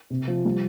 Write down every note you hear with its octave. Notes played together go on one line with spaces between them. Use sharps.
C3
F3
G3